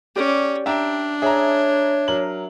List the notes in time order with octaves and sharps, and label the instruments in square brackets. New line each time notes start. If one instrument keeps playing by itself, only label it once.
[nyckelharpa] C#4 [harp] G4 D5
[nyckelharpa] D4 [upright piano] E5 G5 A#5
[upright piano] G#4 A#5 [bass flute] C#5 [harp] E5
[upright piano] F#3 A#4 F#7